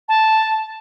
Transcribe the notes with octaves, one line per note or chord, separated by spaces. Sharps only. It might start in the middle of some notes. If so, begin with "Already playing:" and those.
A5